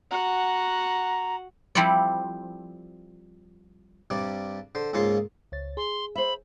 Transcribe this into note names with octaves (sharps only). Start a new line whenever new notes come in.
F#4 F#5 A#5
F3 G3 C4 E4 A4 D5
G2 C3 G3 D5
D3 C5
C#2 G#2 A#3 F4 C#5 C6
C#2 C#5 A6
G#4 C6
C5 E5 B5